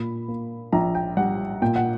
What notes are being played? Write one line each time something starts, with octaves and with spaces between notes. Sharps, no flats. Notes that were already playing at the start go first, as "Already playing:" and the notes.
Already playing: A#2 B5
A#3
A#1 A#5
G5
G3 F#5
A#2 G5
F#5